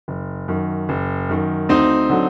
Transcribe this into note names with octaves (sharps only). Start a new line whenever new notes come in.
F#1
F#2 D#3
F#1
F#2 D#3
D2 C4 D#4
D3 F#3